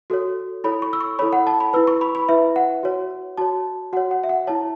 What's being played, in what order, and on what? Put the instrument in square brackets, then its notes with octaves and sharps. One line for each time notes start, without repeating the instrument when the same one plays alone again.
[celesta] F#4 A4 C#5
E4 A4 C#5 B5
C#6
E6
C#6
E4 A4 C#5 B5
F#5
A5
B5
E4 B4 E6
C#6
B5
B5
E4 B4 E5
F#5
F#4 C#5
F#4 C#5 A5
F#4 C#5 F#5
F#5
E5
F#5
E4 C#5 A5